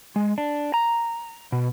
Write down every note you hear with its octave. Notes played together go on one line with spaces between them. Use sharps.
G#3
D4
A#5
B2